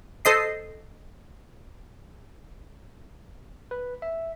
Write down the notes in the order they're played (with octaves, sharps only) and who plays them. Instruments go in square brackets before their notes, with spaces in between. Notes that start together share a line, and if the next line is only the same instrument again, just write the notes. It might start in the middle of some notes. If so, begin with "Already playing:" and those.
[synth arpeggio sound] A4 C5 D#5 C7
[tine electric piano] B4
E5